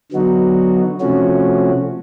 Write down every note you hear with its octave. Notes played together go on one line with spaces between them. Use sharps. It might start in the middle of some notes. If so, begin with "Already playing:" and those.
D3 F#3 B3 D#4 F#4
C3 F3 A3 C#4 F#4